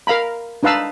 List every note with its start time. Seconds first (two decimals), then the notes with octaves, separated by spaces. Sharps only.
0.07 A#4 F5 A#5 B5
0.63 D4 D#4 B4 F5 A5 E6